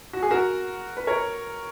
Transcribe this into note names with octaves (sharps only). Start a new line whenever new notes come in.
F#4
G#4
F#4 A#4
B4
A#4 C#5